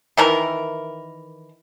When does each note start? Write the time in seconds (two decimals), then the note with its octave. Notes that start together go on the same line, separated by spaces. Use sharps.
0.17 D#3 E3 A#4